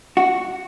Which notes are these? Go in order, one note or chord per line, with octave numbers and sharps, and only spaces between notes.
F#4